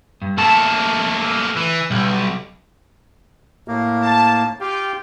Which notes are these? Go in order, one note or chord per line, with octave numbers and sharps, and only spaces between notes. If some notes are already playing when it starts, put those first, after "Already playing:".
G2
A3 A#3 A4 A5
E3
B1 B2 G3
A2 A#3
A5
F4 G4 G5